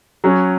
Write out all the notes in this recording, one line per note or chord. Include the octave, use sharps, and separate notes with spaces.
F#3 C#4 F#4